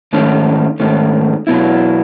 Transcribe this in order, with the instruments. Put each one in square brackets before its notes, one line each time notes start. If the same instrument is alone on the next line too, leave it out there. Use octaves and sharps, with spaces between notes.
[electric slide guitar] G#2 D#3 A3 C#4
G#2 D#3 A3 C#4
B2 F#3 B3 E4